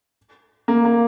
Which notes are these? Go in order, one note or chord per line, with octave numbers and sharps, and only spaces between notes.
A#3
A#3